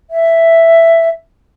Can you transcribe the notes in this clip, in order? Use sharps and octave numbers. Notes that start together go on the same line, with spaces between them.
E5